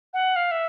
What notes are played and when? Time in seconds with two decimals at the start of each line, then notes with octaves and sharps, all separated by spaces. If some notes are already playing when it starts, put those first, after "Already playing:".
0.14 F#5
0.36 F5
0.51 E5